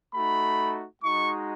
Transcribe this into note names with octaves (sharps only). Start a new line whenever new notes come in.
A3 D#4 F#4 B5
G#3 D#4 F#4 C#6